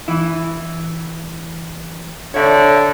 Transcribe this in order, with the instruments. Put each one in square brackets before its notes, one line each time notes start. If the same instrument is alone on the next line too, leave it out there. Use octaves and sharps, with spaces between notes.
[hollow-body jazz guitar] E3 E4
[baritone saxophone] D3 [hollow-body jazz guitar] C#5 E5